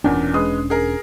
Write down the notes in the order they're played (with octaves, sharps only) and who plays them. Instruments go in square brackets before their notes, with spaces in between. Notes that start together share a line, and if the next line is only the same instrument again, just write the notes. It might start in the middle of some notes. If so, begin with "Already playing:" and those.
[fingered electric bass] E1 C#4 D4 [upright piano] E2 A#2
[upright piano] G#3 B4 D#6
G#4 A#4